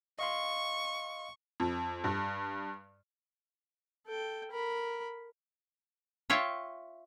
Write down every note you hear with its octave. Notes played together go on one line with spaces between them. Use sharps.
D#5 F5 C6 C#6
F2
G2
A4 G5
A#4 B5
F4 C#5 E5 G5